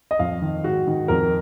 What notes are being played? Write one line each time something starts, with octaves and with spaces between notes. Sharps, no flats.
D#5
F2 F5
D#3
G#2 F#4
D#3
F2 A#4